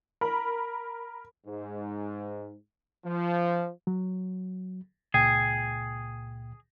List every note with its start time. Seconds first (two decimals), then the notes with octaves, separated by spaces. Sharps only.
0.21 A#4 B5
1.46 G#2
3.05 F3
3.87 F#3
5.14 C#2 A#2 G#4 G5